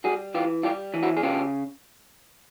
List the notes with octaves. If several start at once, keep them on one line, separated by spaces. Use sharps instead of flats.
G3 F#4 G#4
E3 F4 G4
G3 F4 G4
E3
E4 F#4
G#4
C#3 F4 G4